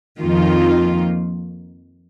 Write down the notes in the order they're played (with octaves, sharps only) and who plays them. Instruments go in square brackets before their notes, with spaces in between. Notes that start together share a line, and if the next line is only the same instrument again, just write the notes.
[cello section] F2 D#3 A#3 F4